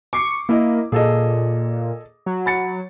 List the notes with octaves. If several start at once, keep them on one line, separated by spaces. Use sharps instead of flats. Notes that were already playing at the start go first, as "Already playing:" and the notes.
C#6 D6 C7 C#7
A#3 E4 D#5
A#2 G#4 A4 D#5
F#3
B5 A6 C#7